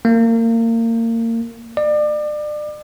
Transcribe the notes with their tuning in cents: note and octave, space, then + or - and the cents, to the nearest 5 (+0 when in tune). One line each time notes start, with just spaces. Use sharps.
A#3 -30
D5 +35